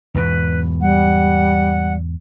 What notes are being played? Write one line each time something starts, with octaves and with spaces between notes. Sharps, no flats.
E2 G#2 B2 B4
G3 F#5